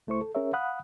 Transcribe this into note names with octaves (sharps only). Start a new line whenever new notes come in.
C#2 A3 E4 C5 C#6
A4
C#4 G#4 A#4 C#5 E5
F5 F#5 B5 D#6 F#6